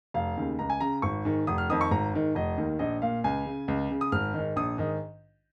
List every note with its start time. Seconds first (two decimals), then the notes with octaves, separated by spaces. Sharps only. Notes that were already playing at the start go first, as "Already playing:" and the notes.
0.14 F1 F5
0.37 D#2 C#3
0.59 C#2 A#5
0.70 G#5
0.80 C#3 A#5
1.02 G#1 C#6
1.25 G#2 D#3
1.47 F1 D#6
1.58 F6
1.69 F2 D#3 D#6
1.81 C#6
1.91 G#1 A#5
2.14 G#2 D#3
2.35 F1 D#5
2.57 D#2 D#3
2.79 A#1 D#5
3.02 A#2 F5
3.24 C#2 G#5
3.46 C#3
3.68 C#2
3.90 C#3
4.01 D#6
4.12 G#1 F6
4.34 G#2 D#3
4.56 A#1 D#6
4.78 G#2 D#3